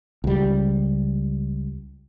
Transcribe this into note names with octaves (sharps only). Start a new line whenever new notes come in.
C#2 G3